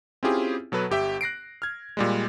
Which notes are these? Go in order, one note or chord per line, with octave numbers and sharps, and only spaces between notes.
C4 C#4 E4 F4 G4 G#4
B2 F#3 A4 B4 B5
G1 G4 E5 G5
F#6 A#6 C7 D7
F6 G#6
A#2 G3 G#3